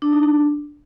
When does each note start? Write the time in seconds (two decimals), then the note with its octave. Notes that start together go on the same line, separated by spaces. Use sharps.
0.02 D4
0.12 D#4
0.23 D4